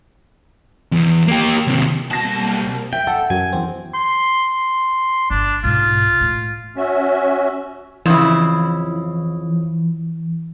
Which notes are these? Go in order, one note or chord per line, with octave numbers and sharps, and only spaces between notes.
E2
A#3 G4
D#2 C3
B1 B2 G3 A#3 C4 A5 A#6
E5 G5
A4 F#5
F#2 G#5
E2 C4
C6
G1 D4
B1 G#2 F4
A2
C#4 F#4 E5
F2 C#3 E3 E4